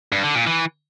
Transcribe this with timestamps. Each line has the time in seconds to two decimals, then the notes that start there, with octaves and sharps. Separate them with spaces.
0.12 G2
0.24 D3
0.35 A#2
0.47 E3